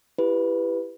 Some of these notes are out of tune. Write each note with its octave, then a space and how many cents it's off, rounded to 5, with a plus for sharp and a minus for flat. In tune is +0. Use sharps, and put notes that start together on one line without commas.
E4 +25 G4 +15 B4 +0